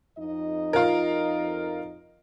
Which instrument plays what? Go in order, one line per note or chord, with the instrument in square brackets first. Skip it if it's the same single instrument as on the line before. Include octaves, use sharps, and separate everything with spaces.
[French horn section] F2 D#4 D#5
[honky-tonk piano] F4 A#4